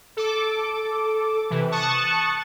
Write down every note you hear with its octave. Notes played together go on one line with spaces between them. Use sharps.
A4 D6
C3 E3
A5 C#6 D#6 F#6 A6 C#7